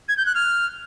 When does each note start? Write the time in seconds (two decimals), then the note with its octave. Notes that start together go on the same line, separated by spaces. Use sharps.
0.09 G#6
0.17 G6
0.26 F#6
0.35 F6